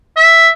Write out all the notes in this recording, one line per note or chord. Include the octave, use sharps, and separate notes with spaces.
E5